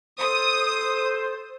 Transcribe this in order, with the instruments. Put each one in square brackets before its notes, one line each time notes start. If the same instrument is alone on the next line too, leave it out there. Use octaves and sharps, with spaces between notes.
[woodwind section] A4 C5 [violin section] D#6